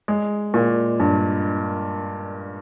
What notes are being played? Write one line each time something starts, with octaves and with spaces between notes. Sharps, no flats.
G#3
A#2
G2